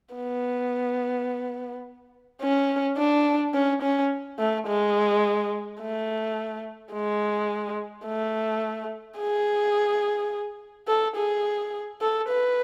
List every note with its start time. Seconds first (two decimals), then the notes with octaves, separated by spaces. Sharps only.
0.15 B3
2.41 C#4
2.98 D4
3.54 C#4
3.82 C#4
4.39 A3
4.67 G#3
5.80 A3
6.93 G#3
8.06 A3
9.19 G#4
10.88 A4
11.17 G#4
12.01 A4
12.29 B4